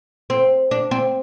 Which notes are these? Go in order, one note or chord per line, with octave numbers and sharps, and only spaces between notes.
C4
D4
C4